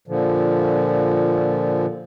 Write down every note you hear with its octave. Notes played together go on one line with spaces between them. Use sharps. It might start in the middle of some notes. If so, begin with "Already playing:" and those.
A#2 D3 F3